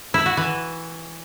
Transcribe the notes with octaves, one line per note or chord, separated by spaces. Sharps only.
E4
F#4
E3